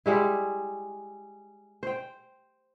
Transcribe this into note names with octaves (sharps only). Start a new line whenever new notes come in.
G3 G#3 E4
C5 G5